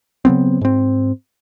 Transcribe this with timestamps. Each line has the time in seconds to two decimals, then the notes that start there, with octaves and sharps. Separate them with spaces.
0.25 C#3 F#3 B3 C4
0.61 G#2 C4